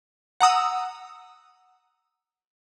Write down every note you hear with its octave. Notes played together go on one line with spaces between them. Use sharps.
F#5 A#5 D#6 E6